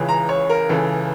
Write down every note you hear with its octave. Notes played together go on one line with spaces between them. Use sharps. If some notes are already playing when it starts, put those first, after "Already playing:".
Already playing: C#2 C#3 E3
A#5
C#5
A#4
C#2 C#3 E3 A4